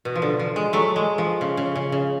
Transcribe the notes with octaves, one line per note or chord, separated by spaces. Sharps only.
B2
F3
D3
F3
G#3
F#3 A3
G#3
F3
C#3
C#3
C#3
C#3